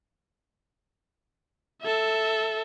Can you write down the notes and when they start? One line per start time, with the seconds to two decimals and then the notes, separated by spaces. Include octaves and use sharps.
1.82 A4 E5